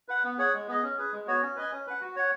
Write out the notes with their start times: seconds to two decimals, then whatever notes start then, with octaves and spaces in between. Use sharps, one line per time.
0.08 B4 F#5
0.24 B3
0.38 G#4 C#5 F#5
0.53 G#3
0.68 B3 G#4 D#5
0.83 C#4
0.98 G#4 B4
1.13 G#3
1.27 B3 F#4 C#5
1.42 C#4
1.56 B4 D#5 G#5
1.72 C#4
1.87 B4 F#5
2.01 F#4
2.16 C#5 F#5